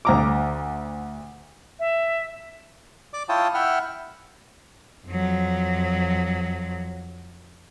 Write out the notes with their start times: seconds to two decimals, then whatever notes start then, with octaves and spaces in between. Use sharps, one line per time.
0.05 D2 A#5 D6
1.79 E5
3.13 D5 D6
3.29 E4 F4 C#5 G5 A5 D#6
3.54 E4 E5 F#5 G5 F6
5.07 F2 F#3